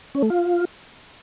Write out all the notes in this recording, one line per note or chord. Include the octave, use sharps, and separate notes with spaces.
C#4
A3
F4